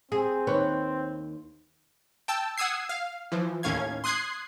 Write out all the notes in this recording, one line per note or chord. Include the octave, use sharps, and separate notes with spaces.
C4 G#4
D#2 B4 C#5
G5 A5 E6
F#5 D#6 E6 G#6 C7
F5
E3 F3
D#2 A2 C#4 F5 G#6
C6 D#6 F#6 G#6 C7